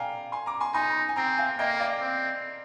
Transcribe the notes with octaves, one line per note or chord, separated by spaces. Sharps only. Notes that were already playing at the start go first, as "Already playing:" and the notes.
Already playing: D5 F5 G5 G#5 A#5
G#5 C6
A#5 D6
G#5 C6
D#4 G#5 C6
G#5
C4 G5 A#5
F5 G#5
A#3 D#5 G5
D5 F5
C4